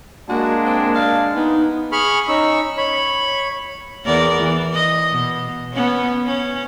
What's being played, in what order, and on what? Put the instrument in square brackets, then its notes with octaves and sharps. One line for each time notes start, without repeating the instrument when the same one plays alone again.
[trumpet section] G#3 D4 [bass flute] A#3 [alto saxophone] F#4
[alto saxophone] C4
F5
[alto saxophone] B3 [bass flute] D#4
[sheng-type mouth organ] G#4 B5 C#6 F6
C#4 D#4 C#6 E6
C#5 B5
[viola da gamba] E2 A#4 D5
E3
D#5
B2
B3 C#4
C#4